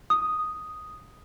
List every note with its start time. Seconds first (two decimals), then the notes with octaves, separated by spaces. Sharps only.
0.10 D#6